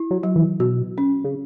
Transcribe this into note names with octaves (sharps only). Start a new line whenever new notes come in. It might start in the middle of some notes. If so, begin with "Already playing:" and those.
Already playing: E4
F#3
F#3
E3
B2 F#4
C#4
C#3